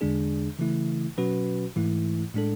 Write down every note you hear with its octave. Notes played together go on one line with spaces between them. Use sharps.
E2 D3 G#3 D4 G#4
C#3 E3 A3 E4
B2 F#3 C#4 F#4 B4
G#2 E3 A3 E4
A2 G#3 D4 A4